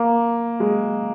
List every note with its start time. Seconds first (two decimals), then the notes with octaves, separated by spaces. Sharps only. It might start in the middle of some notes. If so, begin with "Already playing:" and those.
Already playing: A#3
0.60 G#3